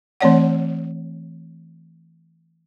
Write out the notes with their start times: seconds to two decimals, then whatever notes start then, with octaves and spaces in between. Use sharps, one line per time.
0.21 E3 A3 C4 C#5 D5 F#5